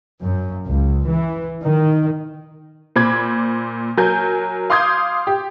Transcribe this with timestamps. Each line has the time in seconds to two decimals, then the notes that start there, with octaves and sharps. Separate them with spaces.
0.22 F#2
0.68 C#2
1.08 E3
1.64 D#3
2.96 A#2 C5 B5 D6 G#6
3.97 F#3 A#4 G#5 G6
4.70 F5 C6 D6 D#6 G6 G#6
5.27 G4